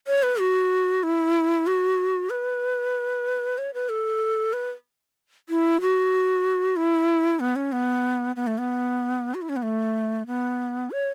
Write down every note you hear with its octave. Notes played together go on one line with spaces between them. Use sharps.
C#5
B4
F#4
E4
F#4
B4
C#5
B4
A4
B4
E4
F#4
E4
B3
C#4
B3
B3
A3
B3
F#4
E4
C#4
B3
A3
B3
C#5